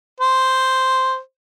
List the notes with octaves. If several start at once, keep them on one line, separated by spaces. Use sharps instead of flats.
C5